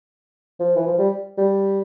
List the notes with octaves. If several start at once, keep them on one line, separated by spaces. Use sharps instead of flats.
F3
E3
F3
G3
G3